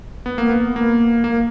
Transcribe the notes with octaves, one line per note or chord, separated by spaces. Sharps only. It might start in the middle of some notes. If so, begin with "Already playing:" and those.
B3
A#3
B3
A#3
A#3